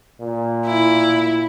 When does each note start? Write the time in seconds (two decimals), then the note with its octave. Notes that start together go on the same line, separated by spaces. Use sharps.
0.21 A#2
0.66 E4